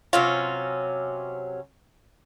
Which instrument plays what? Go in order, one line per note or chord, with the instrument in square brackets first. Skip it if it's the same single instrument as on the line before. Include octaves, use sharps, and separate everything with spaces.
[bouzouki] C3 F#3 C#4 [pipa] F4